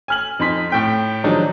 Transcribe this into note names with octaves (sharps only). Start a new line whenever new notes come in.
G#5 F6 F#7
F2 D#4 C6 B6
A2 G5 B6
D#3 F3 F#3 G#3 D4 D#4